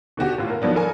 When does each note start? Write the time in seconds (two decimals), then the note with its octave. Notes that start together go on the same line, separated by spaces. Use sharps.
0.17 B2 D3 F#4 G4
0.38 A2 F4
0.50 A#4
0.62 D#3 F3 F#3 B3 D4
0.75 A4 A#4 G#5